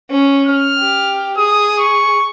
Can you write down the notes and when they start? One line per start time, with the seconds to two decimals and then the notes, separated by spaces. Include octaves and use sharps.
0.10 C#4
0.47 F6
0.79 G4
1.38 G#4 D#6
1.79 C#6